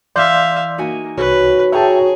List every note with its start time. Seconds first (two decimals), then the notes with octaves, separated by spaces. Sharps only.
0.16 E3 D5 E5 F5 C6 G6
0.78 A#3 D#4 F#4 G#5
1.17 C2 F#4 B4 C#5
1.72 G#4 C#5 E5 G5 A5 A#5 C#6